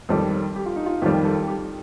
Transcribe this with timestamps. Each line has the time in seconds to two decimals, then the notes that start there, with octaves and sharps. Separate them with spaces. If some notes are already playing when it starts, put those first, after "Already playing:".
0.09 F2 D#3 G3 A4
0.56 G4
0.66 F4
0.76 D#4
0.86 F4
1.01 F2 D#3 G3 G4
1.25 A4
1.48 G4